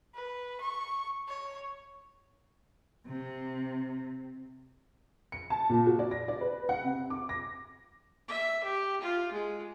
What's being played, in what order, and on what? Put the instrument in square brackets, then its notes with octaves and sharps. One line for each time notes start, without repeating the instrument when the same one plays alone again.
[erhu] B4
C#6
C#5
[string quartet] C3
[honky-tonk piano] C#7
A5
A#2
F#4
D5
A#6
D5
B4
F#5
C3
D6
A#6
[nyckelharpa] E5
G4
F4
G#3